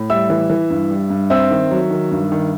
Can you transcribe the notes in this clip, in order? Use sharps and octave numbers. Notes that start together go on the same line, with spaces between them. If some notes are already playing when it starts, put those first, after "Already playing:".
Already playing: A2
G3 E5 E6
E3
E3
G2
G3
G2
C4 E5 E6
D#3
F#3
D#3
G2
D#3